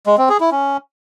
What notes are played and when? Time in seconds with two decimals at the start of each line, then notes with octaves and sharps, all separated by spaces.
0.07 G#3
0.18 C4
0.29 G#4
0.40 E4
0.52 C#4